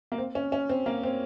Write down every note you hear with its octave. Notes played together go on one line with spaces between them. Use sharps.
A#3
C4
C#4
C#4
C4
A#3
C4